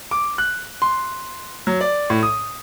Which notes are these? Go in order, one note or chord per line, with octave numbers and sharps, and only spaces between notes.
D6
F#6
C6
F#3
D5
A2
D#6